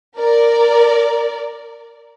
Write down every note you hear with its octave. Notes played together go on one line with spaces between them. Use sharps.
A#4 D5